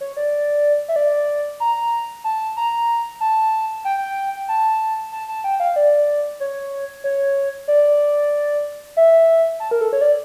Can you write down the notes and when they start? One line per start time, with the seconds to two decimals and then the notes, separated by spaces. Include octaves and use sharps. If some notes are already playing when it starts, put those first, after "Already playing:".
0.01 C#5
0.17 D5
0.88 E5
0.96 D5
1.60 A#5
2.24 A5
2.57 A#5
3.20 A5
3.85 G5
4.49 A5
5.12 A5
5.28 A5
5.44 G5
5.60 F5
5.76 D5
6.40 C#5
7.04 C#5
7.68 D5
8.97 E5
9.60 A5
9.71 A#4
9.81 A4
9.93 C#5
10.01 D5